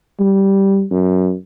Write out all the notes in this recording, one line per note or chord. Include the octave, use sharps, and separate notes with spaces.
G3
F#2